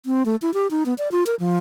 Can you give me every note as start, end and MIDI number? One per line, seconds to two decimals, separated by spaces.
0.06 0.25 60
0.26 0.36 57
0.42 0.53 64
0.54 0.67 67
0.71 0.83 63
0.86 0.94 59
0.98 1.11 74
1.12 1.23 65
1.26 1.35 70
1.40 1.58 53